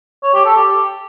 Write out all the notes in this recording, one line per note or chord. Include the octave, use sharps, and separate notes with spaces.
C#5
G4
A4
G4